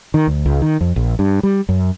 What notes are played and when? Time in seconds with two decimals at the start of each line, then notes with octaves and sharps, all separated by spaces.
0.14 D#3
0.27 D2
0.46 C#2
0.62 D#3
0.81 F2
0.96 A#1
1.19 G2
1.43 G3
1.69 F#2